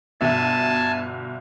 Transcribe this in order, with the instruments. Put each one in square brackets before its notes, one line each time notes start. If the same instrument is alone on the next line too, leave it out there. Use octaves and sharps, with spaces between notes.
[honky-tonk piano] G1 B2 E5 [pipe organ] G#5 A5